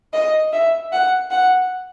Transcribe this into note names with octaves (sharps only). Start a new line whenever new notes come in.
D#5
E5
F#5
F#5